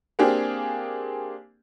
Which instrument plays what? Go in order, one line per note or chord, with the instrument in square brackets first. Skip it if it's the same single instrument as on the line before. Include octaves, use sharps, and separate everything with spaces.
[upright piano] A#3 C4 D4 G4 G#4